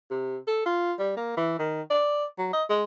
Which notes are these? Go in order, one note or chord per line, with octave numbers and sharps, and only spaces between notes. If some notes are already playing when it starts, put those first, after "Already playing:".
C3
A4
F4
G3
A#3
E3
D#3
D5
F#3
D#5
G#3